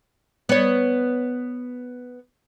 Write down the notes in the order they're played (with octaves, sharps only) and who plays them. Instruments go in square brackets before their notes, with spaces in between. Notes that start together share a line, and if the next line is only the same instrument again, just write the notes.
[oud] B3 C#5